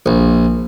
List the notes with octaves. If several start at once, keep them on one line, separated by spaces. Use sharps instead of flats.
A#1